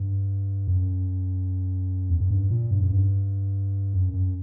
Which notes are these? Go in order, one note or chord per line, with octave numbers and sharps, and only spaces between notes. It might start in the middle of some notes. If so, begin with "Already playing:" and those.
Already playing: G2
F#2
E2
F#2
G2
A#2
G2
F#2
G2
F#2
F#2